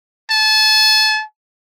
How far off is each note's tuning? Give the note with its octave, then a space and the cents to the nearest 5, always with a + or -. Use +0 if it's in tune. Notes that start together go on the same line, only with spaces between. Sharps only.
A5 -30